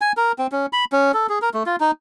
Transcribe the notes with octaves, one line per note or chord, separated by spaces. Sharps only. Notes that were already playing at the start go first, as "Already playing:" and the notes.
G#5
A#4
C4
C#4
B5
C#4
A4
G#4
A#4
A3
F4
D#4